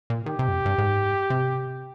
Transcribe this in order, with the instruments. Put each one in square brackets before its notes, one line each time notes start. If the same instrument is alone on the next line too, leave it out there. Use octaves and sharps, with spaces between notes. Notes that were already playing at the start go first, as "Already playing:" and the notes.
[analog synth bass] A#2
[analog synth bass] D#3 [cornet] G4
[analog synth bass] C3
G2
F2
G2
G#2
C3